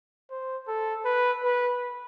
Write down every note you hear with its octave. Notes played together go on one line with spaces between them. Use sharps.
C5
A4
B4
B4